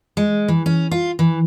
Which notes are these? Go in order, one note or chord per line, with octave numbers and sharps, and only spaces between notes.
G#3
E3
C#4
F4
E3